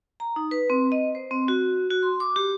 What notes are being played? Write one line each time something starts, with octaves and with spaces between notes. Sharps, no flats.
A#5
D#4
B4
C4
D#5
C5
C4
F#4
F#4
C6
D6
G4